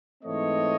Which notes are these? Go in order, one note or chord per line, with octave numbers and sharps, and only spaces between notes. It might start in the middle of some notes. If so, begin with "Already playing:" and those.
G#2 E3 A3 C4 C#5 D#5